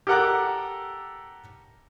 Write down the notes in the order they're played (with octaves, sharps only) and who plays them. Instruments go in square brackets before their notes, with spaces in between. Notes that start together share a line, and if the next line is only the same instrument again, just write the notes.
[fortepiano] G4 A4 A#4 F#5 A#5 D6